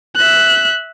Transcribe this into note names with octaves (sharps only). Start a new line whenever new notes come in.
E5 F#6